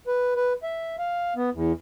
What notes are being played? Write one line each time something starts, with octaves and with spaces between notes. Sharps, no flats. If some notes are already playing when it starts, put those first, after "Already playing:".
B4
B4
E5
F5
B3
E2